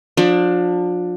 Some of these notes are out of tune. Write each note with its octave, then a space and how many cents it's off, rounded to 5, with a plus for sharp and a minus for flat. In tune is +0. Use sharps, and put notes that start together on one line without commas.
F3 +35 D4 +15